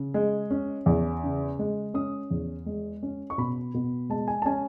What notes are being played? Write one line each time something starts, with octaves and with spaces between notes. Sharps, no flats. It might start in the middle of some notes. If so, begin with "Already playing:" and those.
Already playing: C#3
G#3
C#4
E2
C#3
G#3
C#4 D#6
E2
G#3
C#4
C#6
B2 B5
B2
G#3 A5
G#5
A5
C#4 G#5